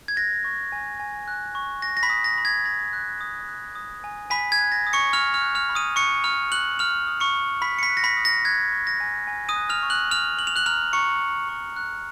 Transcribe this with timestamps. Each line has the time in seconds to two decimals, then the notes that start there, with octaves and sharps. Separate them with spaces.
0.08 G#6
0.16 F#6 A#6
0.44 C#6
0.72 G#5
1.00 G#5
1.28 F#6
1.55 C#6
1.82 F#6 A#6
1.97 A#6
2.03 B5 B6
2.10 D#6
2.24 A#6
2.38 B5
2.45 G#6
2.65 B5 A#6
2.93 F#6
3.21 D#6
3.48 F#6
3.75 D#6
4.04 G#5
4.30 G#5 B5 B6
4.52 G#6
4.59 F#6
4.72 A#6
4.87 D#6
4.93 C#6 C#7
5.13 B5 F6 F7
5.34 F6 F7
5.41 F#6
5.55 F6 F7
5.69 B5
5.75 D#6 D#7
5.96 C#6 F#6 C#7
6.24 B5 F6 F7
6.52 F#6 F#7
6.79 F6 F#6 F7
7.07 D#6
7.20 C#6 C#7
7.35 B5
7.62 B5 B6
7.78 C#7
7.82 B5 B6
7.90 F#6
7.97 A#6
8.04 B5 B6
8.17 D#6
8.25 A#6
8.45 F#6 G#6
8.72 C#6
8.87 A#6
9.00 G#5
9.27 G#5
9.49 D#6 D#7
9.56 F#6
9.69 F6 F7
9.83 C#6
9.90 F#6 F#7
10.11 F6 F#6 F7
10.38 C#6 F#7
10.47 F7
10.56 F#6 F#7
10.66 A#5 F6 F7
10.93 A#5 C#6 C#7
11.21 F#6
11.49 C#6
11.76 F#6